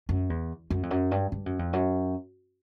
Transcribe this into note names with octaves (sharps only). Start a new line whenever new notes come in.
F#2
E2
F#2
F2
F#2
G2
G2
F#2
F2
F#2